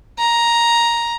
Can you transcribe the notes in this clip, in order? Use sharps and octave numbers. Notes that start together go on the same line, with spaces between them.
A#5